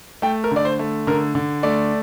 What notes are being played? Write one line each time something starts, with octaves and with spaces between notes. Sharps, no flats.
A3 G5
A#4
D3 D5
C5
A3
D3 A#4
D3
A3 D5